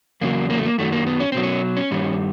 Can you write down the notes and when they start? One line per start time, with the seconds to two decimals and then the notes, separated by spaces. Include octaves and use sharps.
0.21 E2 C#3 F#3 A#3
0.50 A#3
0.58 A3
0.66 A#3
0.78 F#2 D#3 F#3 A3
0.92 A#3
1.07 B3
1.20 C#4
1.32 B2 F#3 C4
1.43 C#4
1.77 C#4
1.91 G2 D#3 G3